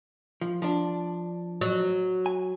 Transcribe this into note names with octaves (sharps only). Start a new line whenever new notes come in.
F3
F3 D4
F#3
G#5